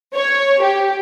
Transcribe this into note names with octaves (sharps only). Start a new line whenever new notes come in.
C#5
G4